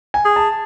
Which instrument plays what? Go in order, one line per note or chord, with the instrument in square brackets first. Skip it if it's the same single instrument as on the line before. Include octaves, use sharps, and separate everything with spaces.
[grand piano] G#5
[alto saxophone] G#4
[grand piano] A5